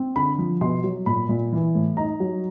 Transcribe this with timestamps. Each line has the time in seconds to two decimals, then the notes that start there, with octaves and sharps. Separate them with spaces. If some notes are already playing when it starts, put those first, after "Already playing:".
Already playing: C4
0.16 D3 B5
0.38 F3
0.61 B2 C6
0.84 F#3
1.06 A#2 B5
1.29 A#2
1.53 E3
1.75 A2
1.97 D#4 A#5
2.20 F#3